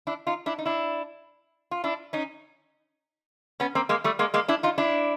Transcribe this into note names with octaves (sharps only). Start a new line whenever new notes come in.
D4 E4
D#4 F4
D4 E4
D#4
D4 E4
F4
D4 E4
C#4 D#4
B3 C#4
A#3 C4
G#3 A#3
G3 A3
G#3 A#3
G#3 A#3
D4 E4
D#4 F4
D4 E4